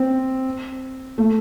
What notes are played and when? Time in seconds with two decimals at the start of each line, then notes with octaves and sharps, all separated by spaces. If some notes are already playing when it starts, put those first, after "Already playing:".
Already playing: C4
1.18 A3